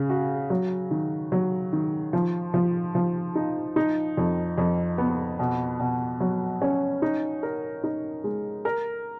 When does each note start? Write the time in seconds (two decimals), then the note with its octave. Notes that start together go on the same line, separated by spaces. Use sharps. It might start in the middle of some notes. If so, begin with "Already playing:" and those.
Already playing: C#3
0.10 F#4
0.50 F#3
0.91 D#3
1.32 F#3
1.73 D#3
2.13 F3
2.54 F3
2.95 F3
3.36 D#4
3.76 D#4
4.17 F2
4.58 F2
4.98 B3
5.39 B2
5.80 B2
6.20 F#3
6.62 C#4
7.02 D#4
7.43 A#4
7.84 D#4
8.24 G#3
8.65 A#4